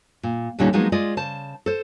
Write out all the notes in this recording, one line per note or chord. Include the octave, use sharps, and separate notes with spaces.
A#2
D#2 A#2 D3 G3 C#4 D#4
F3 F#3 G#3 A#3 B3 D#4
G#3 F4 D5 D#5
C#3 C5 A5
A4 C5